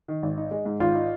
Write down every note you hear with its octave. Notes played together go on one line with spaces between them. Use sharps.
D#3
G#1
D#4
G#3
G#2
G#1 F4
D#4